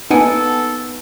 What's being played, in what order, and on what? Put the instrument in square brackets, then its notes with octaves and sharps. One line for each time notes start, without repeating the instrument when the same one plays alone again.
[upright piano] B3 [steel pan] D#4 [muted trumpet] A4 [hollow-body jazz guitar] F#5 G#5